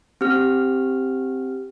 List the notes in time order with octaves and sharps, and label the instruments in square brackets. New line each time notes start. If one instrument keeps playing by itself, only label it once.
[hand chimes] C4 G4 F6